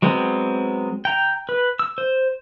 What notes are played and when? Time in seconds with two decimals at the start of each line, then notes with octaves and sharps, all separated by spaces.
0.02 F#3 G#3 B3 C4
1.05 G5 A#5
1.49 B4
1.79 E6
1.98 C5